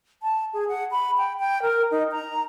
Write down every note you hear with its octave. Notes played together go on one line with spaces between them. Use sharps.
A5
G#4
F#5
B5
G5
G5
A#4
D#4
A#5